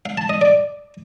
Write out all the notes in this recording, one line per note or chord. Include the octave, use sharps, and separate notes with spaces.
F5
A5
D#5
D5